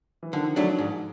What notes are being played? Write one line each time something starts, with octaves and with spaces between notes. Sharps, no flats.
E3
D3 D#3 F3
F#3 A3 D4
G#2